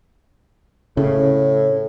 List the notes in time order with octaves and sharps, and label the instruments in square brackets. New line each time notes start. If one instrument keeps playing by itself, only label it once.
[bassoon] A2 [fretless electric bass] C#3